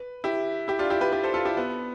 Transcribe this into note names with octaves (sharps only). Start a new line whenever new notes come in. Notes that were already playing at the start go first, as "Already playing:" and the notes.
Already playing: B4
E4 G4
E4 G4
D4 F4
E4 G4
G4 B4
G4 B4
A4 C5
F4 A4
E4 G4
B3